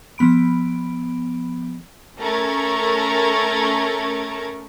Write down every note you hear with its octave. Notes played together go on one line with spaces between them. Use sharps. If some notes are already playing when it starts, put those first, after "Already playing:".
F3 B3 B5 D7
A3 C#4 A#4 A#5 C#6 G#6